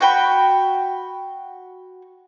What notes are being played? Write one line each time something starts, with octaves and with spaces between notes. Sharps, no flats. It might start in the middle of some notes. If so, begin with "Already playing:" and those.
F#4 G5 B5